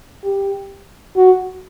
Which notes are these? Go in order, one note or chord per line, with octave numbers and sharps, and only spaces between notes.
G4
F#4